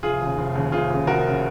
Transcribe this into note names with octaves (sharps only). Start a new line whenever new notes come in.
F1 F4 G#4
D#2 C#3
F1
D#2 C#3
F1 F4 G#4
D#2 C#3
F1 F#4 A#4
C#3